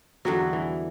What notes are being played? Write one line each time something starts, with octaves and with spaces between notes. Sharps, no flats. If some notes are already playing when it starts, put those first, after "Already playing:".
E2 D3 F#3 G3 B3
E3